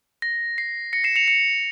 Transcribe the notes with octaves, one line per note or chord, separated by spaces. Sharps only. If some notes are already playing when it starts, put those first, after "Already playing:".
A#6
C7
A#6 C#7
C7 E7
C#7 F7
C#7 F7